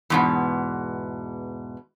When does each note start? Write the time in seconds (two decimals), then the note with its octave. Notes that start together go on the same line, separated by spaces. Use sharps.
0.10 E2 G#2 B2